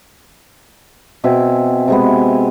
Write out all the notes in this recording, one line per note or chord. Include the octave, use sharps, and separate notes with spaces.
B2 C4 G#4 E5
C3 G#3 B3